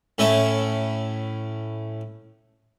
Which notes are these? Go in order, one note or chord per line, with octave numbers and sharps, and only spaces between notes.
A2 A3 C#4 E4 E5 C#6